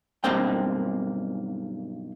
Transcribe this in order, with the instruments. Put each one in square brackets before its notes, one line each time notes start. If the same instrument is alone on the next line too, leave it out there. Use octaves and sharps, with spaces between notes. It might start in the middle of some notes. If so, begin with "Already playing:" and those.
[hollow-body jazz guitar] B1 G2 A#3 C4 G5